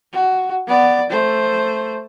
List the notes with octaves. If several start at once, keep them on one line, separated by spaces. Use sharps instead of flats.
F#4
B3 D5
A3 C5